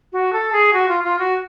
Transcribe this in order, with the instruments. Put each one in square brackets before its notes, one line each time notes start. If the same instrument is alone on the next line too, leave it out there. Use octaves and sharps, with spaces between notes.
[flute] F#4
A4
G#4
F#4
F4
F4
F#4